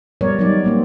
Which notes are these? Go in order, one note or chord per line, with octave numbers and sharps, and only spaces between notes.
G3 B3 A#4 C#5 D5
F#3 G3 B3 D#4 D5
G3 A#3 C4